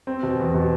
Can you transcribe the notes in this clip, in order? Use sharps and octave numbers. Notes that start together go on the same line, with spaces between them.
C4
B2
E2
B2